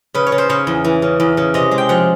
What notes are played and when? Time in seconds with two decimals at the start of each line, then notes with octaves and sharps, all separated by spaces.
0.14 C#3 B4
0.27 C#5
0.32 C#3
0.38 C5
0.49 C#3 C#5
0.67 E2
0.84 E3
1.02 C#3
1.20 E2
1.37 C#3
1.54 C3 D#5
1.71 G#3
1.78 G5
1.89 F3 F#5